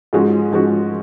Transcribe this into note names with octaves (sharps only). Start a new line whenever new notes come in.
G#2 F3 G#3 C#4 F#4
G#2 F3 G#3 C#4 F#4